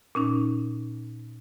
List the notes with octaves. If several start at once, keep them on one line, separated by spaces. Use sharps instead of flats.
A#2 C#4 D#4